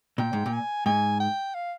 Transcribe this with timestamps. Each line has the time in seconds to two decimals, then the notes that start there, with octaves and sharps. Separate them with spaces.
0.18 A#2 G5
0.33 G#2
0.46 A#2
0.53 G#5
0.86 G#2 G#5
1.20 G5
1.54 F5